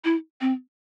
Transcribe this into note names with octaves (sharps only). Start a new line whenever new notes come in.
E4
C4